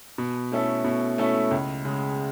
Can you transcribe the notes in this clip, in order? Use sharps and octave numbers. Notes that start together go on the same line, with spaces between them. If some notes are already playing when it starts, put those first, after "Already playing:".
B2
A3 C#4 E4 A4
B2
A3 C#4 E4 A4
C#2
C#3 G#3